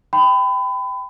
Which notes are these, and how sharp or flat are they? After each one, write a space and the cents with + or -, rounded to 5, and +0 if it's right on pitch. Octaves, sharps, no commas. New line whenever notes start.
G5 +0 B5 +30